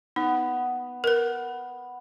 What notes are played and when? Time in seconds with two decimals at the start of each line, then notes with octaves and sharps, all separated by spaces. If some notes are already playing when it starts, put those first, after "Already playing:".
0.16 B3 D#4
1.04 A#4 B4